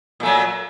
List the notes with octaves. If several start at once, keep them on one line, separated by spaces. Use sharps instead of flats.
A#2 F#3 A3